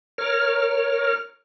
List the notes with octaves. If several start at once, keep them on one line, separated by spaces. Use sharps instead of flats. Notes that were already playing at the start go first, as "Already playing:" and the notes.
A#4 C#5 F6